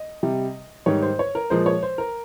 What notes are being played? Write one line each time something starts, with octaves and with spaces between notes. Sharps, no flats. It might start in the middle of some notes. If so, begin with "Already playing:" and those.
Already playing: D#5
C3 G3
G#2 D#3 G3 C#5
C5
C#5
A#4
A#2 F3 G#3 C5
C#5
C5
A#4